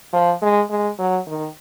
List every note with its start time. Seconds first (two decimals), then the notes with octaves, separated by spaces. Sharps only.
0.13 F3
0.42 G#3
0.70 G#3
0.98 F#3
1.27 D#3